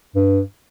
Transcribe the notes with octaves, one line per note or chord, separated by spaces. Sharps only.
G2